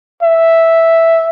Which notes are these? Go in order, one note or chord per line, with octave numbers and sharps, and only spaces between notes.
E5